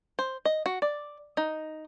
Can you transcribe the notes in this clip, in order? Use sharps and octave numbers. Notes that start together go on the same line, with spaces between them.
C5
D#5
F#4
D5
D#4